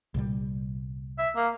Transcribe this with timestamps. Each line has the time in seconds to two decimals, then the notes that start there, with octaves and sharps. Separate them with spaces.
0.14 C2 A#2 G3
1.18 E5
1.36 A#3